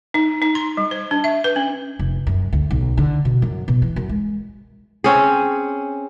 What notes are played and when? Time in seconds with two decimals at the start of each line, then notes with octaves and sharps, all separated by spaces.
0.14 D#4
0.42 D#4
0.55 C6
0.77 G3
0.91 C5
1.11 D4
1.24 E5
1.44 B4
1.56 C#4
1.99 F1
2.27 F#2
2.53 D2
2.71 B1
2.97 D3
3.25 B2
3.42 F#2
3.68 B2
3.82 E3
3.96 F#2
4.09 G#3
5.04 C4 C#4 G#4